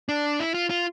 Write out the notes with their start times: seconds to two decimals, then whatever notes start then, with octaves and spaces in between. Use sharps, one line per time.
0.09 D4
0.40 E4
0.54 F4
0.70 F4